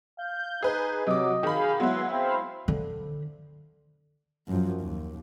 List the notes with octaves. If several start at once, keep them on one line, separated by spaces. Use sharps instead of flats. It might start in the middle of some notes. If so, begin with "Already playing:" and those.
F5 G6
D#4 G#4 B4
C3 F#3 D#5 D6
D#3 G#4 F5 B5
F#3 G#3 B3 E4 F#5 C6
C4 C5 F5 B5
D3
F#2 F3
D#2